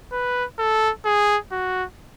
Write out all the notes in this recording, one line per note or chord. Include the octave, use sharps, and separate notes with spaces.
B4
A4
G#4
F#4